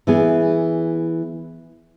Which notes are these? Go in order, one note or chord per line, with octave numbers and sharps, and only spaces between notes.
E3 B3 G#4